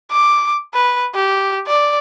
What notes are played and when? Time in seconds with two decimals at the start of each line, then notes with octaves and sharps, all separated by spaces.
0.11 D6
0.75 B4
1.14 G4
1.67 D5